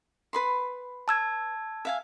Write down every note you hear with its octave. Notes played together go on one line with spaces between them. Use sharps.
B4 B5 C6
A5 E6 G#6
E5 F5 G#5